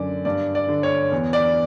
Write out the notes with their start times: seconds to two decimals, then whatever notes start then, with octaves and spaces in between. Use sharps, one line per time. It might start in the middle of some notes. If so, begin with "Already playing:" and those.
Already playing: F#2 D3 D5
0.25 G2 D5
0.55 D5
0.69 D3
0.83 C#5
1.11 E2
1.33 D5